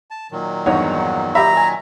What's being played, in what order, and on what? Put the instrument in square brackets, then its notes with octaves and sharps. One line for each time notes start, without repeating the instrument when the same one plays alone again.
[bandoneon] A5
A#2 D#3 F#3
[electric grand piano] E2 G2 F#5 [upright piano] D#4 C#5
[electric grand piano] G4 B5 [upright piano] E5 [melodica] A#5
[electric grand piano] G#5